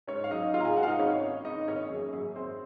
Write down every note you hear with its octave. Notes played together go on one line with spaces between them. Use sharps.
G#2 C#4 C#5
F5
F#3 D#4 D#5
G#1 F4 F5
A#5
G#4 G#5
G#2 F#4 F#5
F5
D#4 D#5
G#1 C#4 C#5
G#1
G#1 D#4 D#5
G#1 C#4 C#5
F#2 G#4
F#2 G#4
G#1 C4 C5